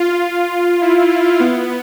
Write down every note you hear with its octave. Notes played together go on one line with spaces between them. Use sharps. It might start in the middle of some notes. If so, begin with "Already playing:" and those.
Already playing: F4
E4
B3